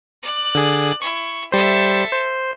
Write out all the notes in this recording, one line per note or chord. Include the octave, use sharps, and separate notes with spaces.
D5 F#6
D3 G#4
E4 C#6
G3 A4 C5 E5
C5